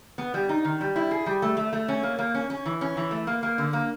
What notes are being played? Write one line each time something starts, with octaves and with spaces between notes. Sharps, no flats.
B3
G3
D#4
D#3
G3
E4
G#4
G3
A3
A3
A3
C#4
A#3
A#3
C#4
C#4
E3
C#4
E3
A3
A#3
A#3
D3
A#3